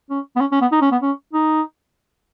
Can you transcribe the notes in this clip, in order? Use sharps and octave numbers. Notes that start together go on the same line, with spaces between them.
C#4
B3
C#4
C#4
B3
D#4
C#4
B3
C#4
D#4